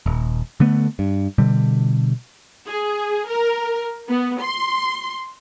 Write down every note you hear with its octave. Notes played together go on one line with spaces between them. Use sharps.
D#1
D3 A3 B3
G2
B2 D3 G3
G#4
A#4
B3
C6